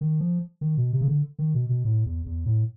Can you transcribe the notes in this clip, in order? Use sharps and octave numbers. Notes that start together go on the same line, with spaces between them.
D#3
F3
D#3
B2
C3
C#3
D3
D#3
B2
B2
A2
E2
E2
A2